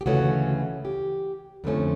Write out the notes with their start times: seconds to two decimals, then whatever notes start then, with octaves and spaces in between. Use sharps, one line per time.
0.01 G4
0.06 D2 C#3 E3 A3 C#4 F#4
0.85 G4
1.64 F2 D3 F3 A3 C#4